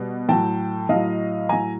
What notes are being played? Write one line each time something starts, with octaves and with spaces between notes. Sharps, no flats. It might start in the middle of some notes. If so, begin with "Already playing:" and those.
Already playing: B2 G3
A2 F#3 G5 A5
A2 F#3 D#5 F5
A2 F#3 G#5 A#5